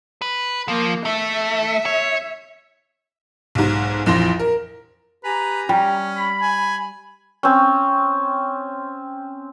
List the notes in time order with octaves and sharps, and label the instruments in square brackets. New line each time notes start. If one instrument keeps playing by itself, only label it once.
[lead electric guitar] B4
[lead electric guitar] F3 [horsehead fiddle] A#3
[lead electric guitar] A3 [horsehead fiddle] E5
[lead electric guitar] C#5
[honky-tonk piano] B1 G#2
A#1 F2 E3 C6 A#6
A#4
[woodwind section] G4 G#5 A#5 [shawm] B4
[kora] G3 [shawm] C#4
[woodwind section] B5
[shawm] G#5
[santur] C4 C#4